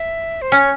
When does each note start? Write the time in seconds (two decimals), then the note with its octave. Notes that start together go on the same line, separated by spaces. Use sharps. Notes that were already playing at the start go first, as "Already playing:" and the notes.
Already playing: E5
0.42 C5
0.52 C#4 C#5